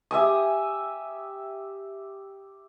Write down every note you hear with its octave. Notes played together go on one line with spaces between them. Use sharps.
G4 E5 G#5 D#6